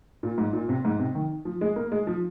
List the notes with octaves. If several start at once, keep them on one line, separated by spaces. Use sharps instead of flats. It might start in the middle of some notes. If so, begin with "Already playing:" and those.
A#2
G#2
A#2
C3
G#2
C3
D#3
F3
G#3
A#3
G#3
F3